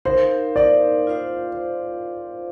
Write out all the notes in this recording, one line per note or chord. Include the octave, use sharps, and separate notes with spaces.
D#4 A#4 C5 F5
D#4 A#4 D5 F5
F4 C5 F5